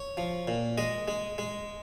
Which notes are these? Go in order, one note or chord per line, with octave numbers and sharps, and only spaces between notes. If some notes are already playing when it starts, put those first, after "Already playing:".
Already playing: C#5
F3
A#2
G#3 D#5
G#3
G#3